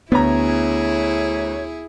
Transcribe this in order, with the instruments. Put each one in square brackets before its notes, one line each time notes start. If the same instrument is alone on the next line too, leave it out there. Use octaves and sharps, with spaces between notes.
[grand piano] D2 A#5 [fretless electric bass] B3 [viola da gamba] E4 G#4 [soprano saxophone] C#5